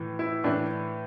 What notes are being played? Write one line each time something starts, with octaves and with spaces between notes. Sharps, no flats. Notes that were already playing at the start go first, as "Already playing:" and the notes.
Already playing: A2 E3
E4
A2 E3 D4